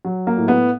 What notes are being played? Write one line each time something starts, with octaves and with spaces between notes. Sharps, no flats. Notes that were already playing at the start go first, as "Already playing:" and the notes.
F#3
A#3
A2
B3